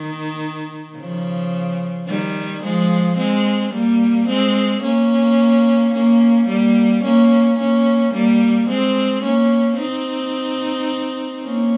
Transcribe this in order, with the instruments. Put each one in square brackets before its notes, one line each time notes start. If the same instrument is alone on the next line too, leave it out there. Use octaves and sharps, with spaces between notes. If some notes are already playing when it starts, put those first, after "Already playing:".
Already playing: [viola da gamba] D#3
C#3 F3
D#3 G3
F3 G#3
G#3 C4
G3 A#3
G#3 C4
A#3 C#4
A#3 C#4
G3 A#3
A#3 C#4
A#3 C#4
G3 A#3
G#3 C4
A#3 C#4
C4 D#4
A#3 C#4